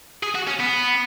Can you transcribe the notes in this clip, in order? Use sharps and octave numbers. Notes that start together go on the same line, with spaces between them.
G#4
F#4
C#4
B3